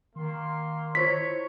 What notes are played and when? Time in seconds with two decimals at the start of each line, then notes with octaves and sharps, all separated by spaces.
0.16 D#3 A#3 C6
0.95 E4 F4 C5 C#5 B6